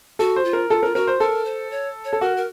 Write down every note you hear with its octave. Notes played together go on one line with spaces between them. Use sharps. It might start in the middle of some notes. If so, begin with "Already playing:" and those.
F#4 A4
C5
F4
A#4
F4 A4
F4 A#4
F#4 A#4
C5
A4 A#4
C5
C#5
C#5
A4
F#4 A#4
A#4